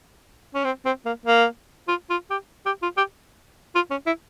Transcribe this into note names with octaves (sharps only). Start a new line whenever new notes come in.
C#4
C4
C4
A#3
A#3
F4
F4
G4
G4
F4
G4
F4
C#4
E4